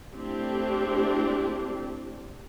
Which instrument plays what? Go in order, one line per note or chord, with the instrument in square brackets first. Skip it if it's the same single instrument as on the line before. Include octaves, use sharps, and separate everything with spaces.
[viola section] A3 C4 D4 E4 G4